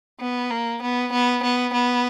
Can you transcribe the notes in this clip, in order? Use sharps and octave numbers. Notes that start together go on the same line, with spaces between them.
B3
A#3
B3
B3
B3
B3